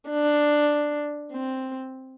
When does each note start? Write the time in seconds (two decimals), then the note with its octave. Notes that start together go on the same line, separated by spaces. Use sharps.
0.10 D4
1.32 C4